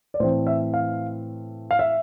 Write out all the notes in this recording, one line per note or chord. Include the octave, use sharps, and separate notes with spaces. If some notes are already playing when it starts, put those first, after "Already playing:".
D5
A2 E3 A3 C4 C5
E5
F5
F5
E5